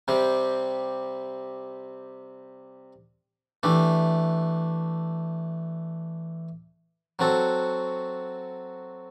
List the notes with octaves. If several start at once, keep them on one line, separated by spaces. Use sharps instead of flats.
C3 G3 C4 G4
E3 A3 D4 G4
F#3 C4 F#4 A4